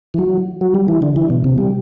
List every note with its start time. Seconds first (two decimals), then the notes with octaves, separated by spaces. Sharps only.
0.14 E3
0.18 F#3
0.61 F#3
0.75 G3
0.88 E3
1.02 D3
1.16 E3
1.30 B2
1.44 C3
1.58 G3